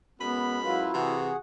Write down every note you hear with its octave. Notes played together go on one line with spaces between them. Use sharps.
F#2 G#3 B3 B5
F#3 E4 F4 B4
C3 E3 F#4 G#4 F#5